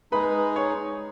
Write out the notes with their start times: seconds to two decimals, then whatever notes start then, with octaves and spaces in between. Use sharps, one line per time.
0.12 G#3 D#4 G#4 B4 B5
0.56 C#5 C#6